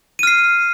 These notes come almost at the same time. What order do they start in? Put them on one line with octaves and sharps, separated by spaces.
D#7 F6 C7